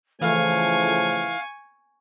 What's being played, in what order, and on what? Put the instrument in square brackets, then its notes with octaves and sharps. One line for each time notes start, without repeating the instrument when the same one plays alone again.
[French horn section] C#3 F3 A3 [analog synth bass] E3 [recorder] F5 [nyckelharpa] G#5 C#6